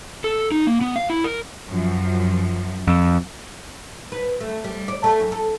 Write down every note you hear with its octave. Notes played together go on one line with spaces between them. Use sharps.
A4
D#4
A#3
B3
F5
E4
A#4
F#2 F3
F2
B4
A3
G3
D5
A3
F#2
A4